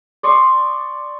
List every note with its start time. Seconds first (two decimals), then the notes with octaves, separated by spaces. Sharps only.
0.23 D5 C6 C#6 D#6